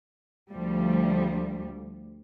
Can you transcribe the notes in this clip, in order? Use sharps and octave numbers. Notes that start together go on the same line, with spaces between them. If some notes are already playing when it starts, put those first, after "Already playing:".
D2 F3 G3